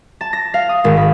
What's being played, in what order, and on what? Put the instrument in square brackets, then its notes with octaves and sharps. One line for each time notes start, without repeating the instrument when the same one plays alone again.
[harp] A5
A#6
F5
D#6
G#1
B5